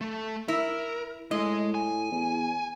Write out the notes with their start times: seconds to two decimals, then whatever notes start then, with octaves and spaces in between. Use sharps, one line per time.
0.01 A3 A4
0.48 E4 A#4
1.31 A2 G#3 D#5
1.75 G#5
2.12 E2